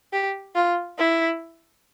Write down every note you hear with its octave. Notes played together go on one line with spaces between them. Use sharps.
G4
F4
E4